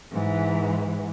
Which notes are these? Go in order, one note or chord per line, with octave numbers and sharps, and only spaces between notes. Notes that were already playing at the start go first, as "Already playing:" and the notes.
G#2 E3